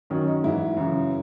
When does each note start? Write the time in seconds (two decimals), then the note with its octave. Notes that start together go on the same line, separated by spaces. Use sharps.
0.10 F#2 D#3 F#3 C#4
0.28 D#4
0.44 G#2 E3 E4
0.77 F#2 C#3 E3